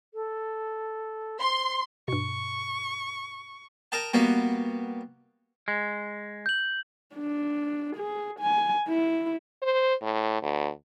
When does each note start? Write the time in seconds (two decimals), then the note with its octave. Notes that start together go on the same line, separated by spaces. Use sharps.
0.14 A4
1.40 C5 C6
2.08 G2 B2 C#6
3.92 A#4 D#5 G5 A5
4.13 G3 A#3 B3 F#4
5.68 G#3
6.46 G6 F#7
7.15 D4
7.96 G#4
8.40 G#5
8.88 E4
9.62 C5
10.02 A2
10.42 D2